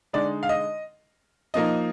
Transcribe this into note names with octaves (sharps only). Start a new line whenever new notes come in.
D3 G#3 D#4 D5
F5
D#5
F3 A#3 D#4 D#5